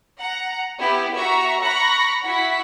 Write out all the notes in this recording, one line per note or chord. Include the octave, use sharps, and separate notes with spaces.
F#5 A#5
B3 E4 G4
F#4 E5 A#5 C#6
A#5 B5 C#6 F#6 A#6
E4 F#4 F#5 B6